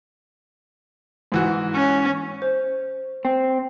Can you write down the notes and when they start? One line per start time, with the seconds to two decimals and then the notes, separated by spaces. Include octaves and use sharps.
1.32 G#2 E3 F#4
1.74 C#4
2.42 C5
3.25 C4